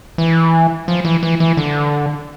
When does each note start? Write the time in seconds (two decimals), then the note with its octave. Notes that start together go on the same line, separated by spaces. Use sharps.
0.18 E3
0.88 F3
1.05 E3
1.23 E3
1.40 E3
1.57 D3